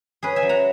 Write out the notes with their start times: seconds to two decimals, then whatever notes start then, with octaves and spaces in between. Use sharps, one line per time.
0.23 C#4 G#4 B4
0.36 E5 G#5
0.43 F#3
0.49 F#5 A#5